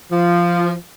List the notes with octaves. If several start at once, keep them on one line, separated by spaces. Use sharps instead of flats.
F3